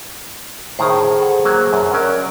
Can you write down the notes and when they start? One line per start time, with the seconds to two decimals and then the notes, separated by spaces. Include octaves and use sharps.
0.79 A2 D#3 G#4 C5
1.19 A4 F#5
1.44 F#3 A#3
1.73 F#2
1.93 F#3 C#4 A#4 D5